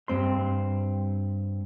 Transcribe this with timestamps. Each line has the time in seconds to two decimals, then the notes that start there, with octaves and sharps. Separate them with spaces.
0.08 G2 C4 C6